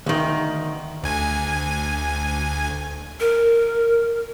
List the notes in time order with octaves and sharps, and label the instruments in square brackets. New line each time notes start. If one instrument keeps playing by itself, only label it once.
[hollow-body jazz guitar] D2 D#3
[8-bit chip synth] D2 G#5
[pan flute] A#4